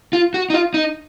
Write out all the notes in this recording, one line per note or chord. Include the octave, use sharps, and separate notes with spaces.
F4
F#4
D#4
F4
D#4